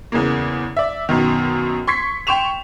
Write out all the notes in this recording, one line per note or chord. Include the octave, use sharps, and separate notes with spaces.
E2 C#3 G#3 A#3
D5 E5
F#2 B2 D#3
C6 C#6 G#6 B6 C7
G5 C6 C#6 E7 F7